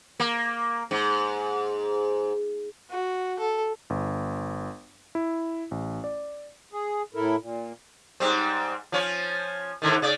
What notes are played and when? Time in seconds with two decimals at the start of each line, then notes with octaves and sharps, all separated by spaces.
0.20 A#3
0.91 G#2
2.90 F#4
3.39 A4
3.90 G1
5.15 E4
5.71 A1
6.04 D5
6.72 G#4
7.14 A2 E4 A4 A#4
7.38 A#2
8.20 G#2 G3 C4
8.92 F3 C#4
9.82 G#2 D3 D#3
10.02 C#3 D5